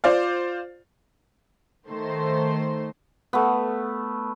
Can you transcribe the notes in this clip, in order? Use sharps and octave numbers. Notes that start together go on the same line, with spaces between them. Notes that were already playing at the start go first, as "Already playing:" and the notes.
F4 C5 D5 F5
D#3 A3 C5
A3 B3